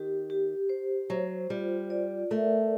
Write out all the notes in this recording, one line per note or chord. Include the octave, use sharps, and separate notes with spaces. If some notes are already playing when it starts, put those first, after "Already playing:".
Already playing: D#3 G4
G4
C5
F#3 C5
G3 F4
D5
A3 A#4